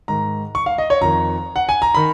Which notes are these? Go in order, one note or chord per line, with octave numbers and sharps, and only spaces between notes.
G#2 D#3 A#5
C#6
F5
D#5
C#5
F2 D#3 A#5
F#5
G#5
A#5
D#3 B5